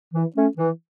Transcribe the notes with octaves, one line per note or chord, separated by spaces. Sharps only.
E3
A3 C#4
E3